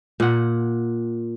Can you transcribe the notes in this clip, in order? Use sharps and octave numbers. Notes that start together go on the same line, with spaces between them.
A#2 F#5